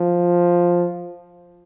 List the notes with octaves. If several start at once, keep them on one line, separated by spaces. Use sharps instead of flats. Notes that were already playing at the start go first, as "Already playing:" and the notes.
Already playing: F3